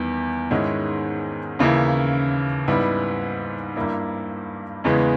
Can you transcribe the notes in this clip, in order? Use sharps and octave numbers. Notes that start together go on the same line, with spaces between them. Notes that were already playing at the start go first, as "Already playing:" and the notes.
Already playing: E2 D#3 G3 B3 E4
G#2 D#3 G#3 C#4 E4
D#2 C#3 E3 A#3 E4
G#2 G3 B3 E4
G2 G3 A#3 E4
E2 C#3 E3 G#3 B3